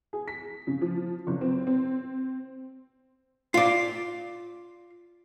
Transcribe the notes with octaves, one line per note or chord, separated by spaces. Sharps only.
G#4
B6
C#3
F3
F#1
C4
C4
F4 D5